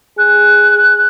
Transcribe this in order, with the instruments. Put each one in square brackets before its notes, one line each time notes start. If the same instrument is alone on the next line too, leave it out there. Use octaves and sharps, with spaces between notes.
[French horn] G#4 [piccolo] F#6